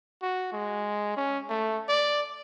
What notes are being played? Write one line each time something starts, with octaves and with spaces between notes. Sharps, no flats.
F#4
G#3
C#4
A3
D5